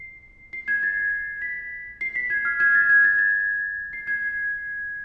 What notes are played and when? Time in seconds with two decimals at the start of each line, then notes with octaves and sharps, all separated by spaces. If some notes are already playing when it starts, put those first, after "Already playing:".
Already playing: C7
0.53 C7
0.68 G#6
0.83 A6
1.42 B6
2.01 C7
2.16 B6
2.30 G#6
2.45 F6
2.60 G#6
2.75 A6
2.89 G#6
3.04 A6
3.19 A6
3.93 C7
4.07 G#6